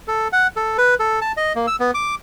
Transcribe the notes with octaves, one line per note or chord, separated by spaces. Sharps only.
A4
F#5
A4
B4
A4
A5
D#5
A#3
E6
B3
D6